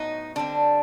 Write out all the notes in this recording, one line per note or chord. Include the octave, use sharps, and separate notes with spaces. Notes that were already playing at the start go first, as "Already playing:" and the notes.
Already playing: A2 F#3 B3 D#4
D3 G3 C4 D4